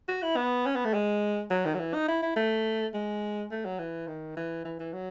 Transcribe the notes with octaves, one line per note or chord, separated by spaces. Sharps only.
F#4
E4
B3
C#4
B3
A3
G#3
F#3
D#3
F#3
E3
D#4
E4
E4
A3
G#3
A3
F#3
E3
D#3
E3
E3
E3
F#3